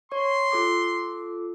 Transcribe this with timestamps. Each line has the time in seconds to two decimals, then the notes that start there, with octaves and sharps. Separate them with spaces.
0.12 C#5 C6 C#6
0.52 F4 A4 D6